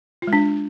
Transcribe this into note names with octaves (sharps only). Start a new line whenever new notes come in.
F4
G#3
D4